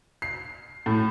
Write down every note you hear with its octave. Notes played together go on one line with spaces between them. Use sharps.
C7
A2